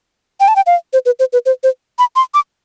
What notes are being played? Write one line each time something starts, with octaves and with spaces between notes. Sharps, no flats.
G5
A5
G5
F5
C5
B4
C5
B4
C5
C5
B5
C6
D6